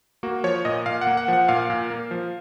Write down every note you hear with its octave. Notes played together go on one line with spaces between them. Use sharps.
A#3 F#4
F3 C#5
A#2 D#5
A#2 F5
F#5
A#3
F#5
F3 F#5
A#2 F5
A#2
A#3
F3